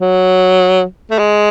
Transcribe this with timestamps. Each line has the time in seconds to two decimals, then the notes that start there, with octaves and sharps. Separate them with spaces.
0.01 F#3
1.11 A3
1.19 G#3